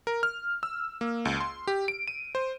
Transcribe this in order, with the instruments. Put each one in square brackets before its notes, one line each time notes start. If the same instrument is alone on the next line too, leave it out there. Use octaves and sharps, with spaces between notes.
[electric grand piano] A#4
F6
E6
A#3
C#2
C6
G4
D7
D#7
C5